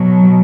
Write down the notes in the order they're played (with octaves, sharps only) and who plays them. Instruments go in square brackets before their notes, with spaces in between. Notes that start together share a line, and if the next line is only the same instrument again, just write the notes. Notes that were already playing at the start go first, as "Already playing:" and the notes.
Already playing: [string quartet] B2 F#3